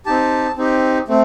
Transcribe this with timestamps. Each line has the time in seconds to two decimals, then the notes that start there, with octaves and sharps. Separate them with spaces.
0.06 C4 D#4 G4 A5
0.57 C4 D#4 G4
1.08 A3 C4